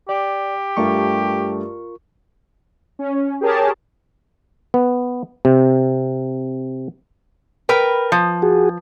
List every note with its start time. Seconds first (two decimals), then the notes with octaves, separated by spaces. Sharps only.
0.09 G4 D5
0.77 G2 A3 F4 A#4 C#6
2.99 C#4
3.41 G4 G#4 A#4 C#5 A5
4.74 B3
5.45 C3
7.69 A#4 B4 G5
8.12 F3
8.42 F#4 G#4